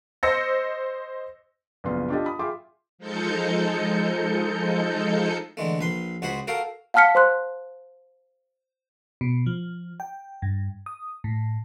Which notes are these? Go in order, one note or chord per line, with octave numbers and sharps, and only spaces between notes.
C5 D#5 E6 A#6 C#7
A#1 F#2 C#3 B3 F4 C6
D4 F4 G4 A4 D#5
B5 D#6
F4 G#4 E5 G5 C6 D6
F3 G#3 D#4 A4 G6 C#7
D3 E3 G#3 A3
A#1 B4 C6
C#2 F#4 G#4 C5 F#5 B5
F#4 A4 A#4 F5 G5
F5 F#5 A5 F6 B6 C#7
C5 C6 F#6
B2
F3
G5
G2
D#6
A2